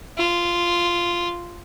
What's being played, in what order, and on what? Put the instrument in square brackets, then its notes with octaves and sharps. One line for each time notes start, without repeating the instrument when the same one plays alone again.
[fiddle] F4